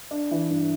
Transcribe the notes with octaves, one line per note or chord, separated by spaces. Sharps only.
D4
E3
G2